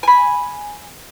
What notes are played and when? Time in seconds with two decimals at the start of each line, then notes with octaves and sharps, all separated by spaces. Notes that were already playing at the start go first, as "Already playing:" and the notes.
0.03 G#5 B5